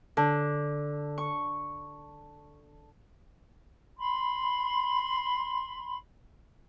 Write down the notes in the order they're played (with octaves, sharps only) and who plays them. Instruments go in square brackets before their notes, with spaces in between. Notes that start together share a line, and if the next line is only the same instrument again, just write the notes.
[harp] D3
C#6
[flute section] B5 C6